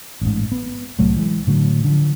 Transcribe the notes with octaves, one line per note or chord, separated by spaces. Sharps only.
A1 G#2
B3
C2 A2 F#3 A3
E3 G#3
A2 D3 F#3
D3 F3